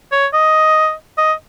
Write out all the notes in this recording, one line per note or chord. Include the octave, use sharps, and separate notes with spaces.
C#5
D#5
D#5